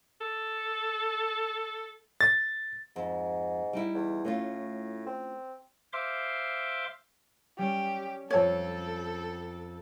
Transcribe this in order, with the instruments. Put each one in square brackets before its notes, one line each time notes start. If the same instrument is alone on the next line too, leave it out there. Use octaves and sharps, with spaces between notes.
[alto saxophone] A4
[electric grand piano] A6
[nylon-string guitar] F2 [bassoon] G#2
[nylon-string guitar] G3 D#4 E4
[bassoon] E2
[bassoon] A2 [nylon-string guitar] A3 C#4 F4
[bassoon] C4
[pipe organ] C5 E5 F5 C6 D6
[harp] G3 C#4 [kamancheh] G4
[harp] F2 G#6 [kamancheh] A4 [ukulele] C#5 A5